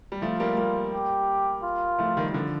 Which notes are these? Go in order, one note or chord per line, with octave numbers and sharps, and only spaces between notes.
G3
F3 A3 F4
G3 A#3
G3 A#3
G4
F4
F3 A3
D#3 G3
D#3
D3 F3